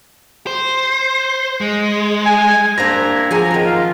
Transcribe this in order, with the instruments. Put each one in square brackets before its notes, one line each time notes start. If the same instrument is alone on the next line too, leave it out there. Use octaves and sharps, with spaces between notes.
[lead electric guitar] C5
G#3
[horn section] G#5
[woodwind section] C2 A#3 E4 [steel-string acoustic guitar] D4 A#5 [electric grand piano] C5 G#6 A#6
[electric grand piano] F3 [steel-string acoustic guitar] G#4 F#5 G#5 [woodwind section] A#5
[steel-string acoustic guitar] D#3 C4
[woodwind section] F4